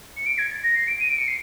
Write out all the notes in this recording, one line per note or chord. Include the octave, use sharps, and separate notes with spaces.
C#7
D7
G#6
A6
A#6
C7
D7
D#7
D7
C#7
C7